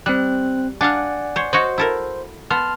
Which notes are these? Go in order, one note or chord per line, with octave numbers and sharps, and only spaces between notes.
G3 C4 F#6
D4 D5 F5 F#5 G#5
C5 C#5
F#4 C5 C#5 D#5
E4 A4 A#4
B3 A5 C6 F6